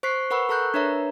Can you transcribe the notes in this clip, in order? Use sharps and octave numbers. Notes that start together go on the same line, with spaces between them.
C5 C#6 F#6 B6 C7
A#4 B4 F#5 B5 C#6 E6
A4 A#4 A#5 C#6 F#6 G6
D4 A#4 B4 C#5 E5 A#5